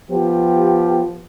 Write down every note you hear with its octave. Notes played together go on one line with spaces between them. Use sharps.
F3 B3 G4